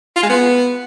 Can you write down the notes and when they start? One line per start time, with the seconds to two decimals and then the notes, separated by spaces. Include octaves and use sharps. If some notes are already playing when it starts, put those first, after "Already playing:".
0.16 F4
0.23 G#3
0.30 B3